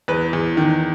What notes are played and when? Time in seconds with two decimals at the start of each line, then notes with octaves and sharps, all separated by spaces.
0.08 E2 B4
0.33 E2
0.57 D#3